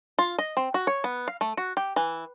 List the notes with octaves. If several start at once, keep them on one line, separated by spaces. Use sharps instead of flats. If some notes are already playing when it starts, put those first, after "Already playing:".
F4
D#5
C4
F#4
C#5
B3
F5
A3
F#4
G4
E3